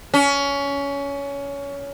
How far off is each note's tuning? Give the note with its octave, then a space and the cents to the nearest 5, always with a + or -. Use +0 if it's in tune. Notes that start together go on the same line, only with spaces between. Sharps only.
C#4 +20